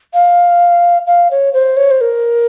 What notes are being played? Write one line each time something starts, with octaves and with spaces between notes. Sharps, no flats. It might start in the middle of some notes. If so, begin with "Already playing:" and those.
F5
F5
C#5
C5
C#5
C5
A#4